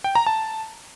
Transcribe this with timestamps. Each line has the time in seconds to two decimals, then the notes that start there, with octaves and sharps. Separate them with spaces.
0.04 G5
0.15 A#5
0.27 A5